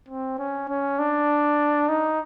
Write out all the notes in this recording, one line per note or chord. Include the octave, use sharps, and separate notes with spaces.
C4
C#4
C#4
D4
D#4